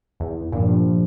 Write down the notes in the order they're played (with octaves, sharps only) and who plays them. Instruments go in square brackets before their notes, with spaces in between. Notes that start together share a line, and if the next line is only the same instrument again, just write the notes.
[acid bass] E2
[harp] G2 F3 [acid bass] A#2